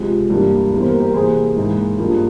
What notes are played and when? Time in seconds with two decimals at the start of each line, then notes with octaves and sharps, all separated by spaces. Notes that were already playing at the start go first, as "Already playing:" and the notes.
Already playing: C3 F3 G#3
0.30 G2 E3 G3 A#3
0.72 E2 E3 G3 A#3
0.80 C5
0.86 G4 A#4
1.00 G4 A#4
1.14 C3 E3 A#3 G#4 C5
1.56 G#2 E3 A#3
1.98 G2 F3 A#3